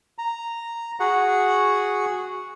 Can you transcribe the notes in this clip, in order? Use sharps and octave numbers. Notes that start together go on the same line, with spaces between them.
A#5
F#4 G#4 F#5